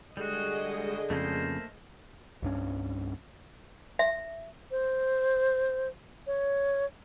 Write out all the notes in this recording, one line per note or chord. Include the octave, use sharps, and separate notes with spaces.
D3 G3 G#3 F#4 G#4 D#5
F2 C#3 A3 A#3 C5
C2 G2 C#4
E5
C5
C#5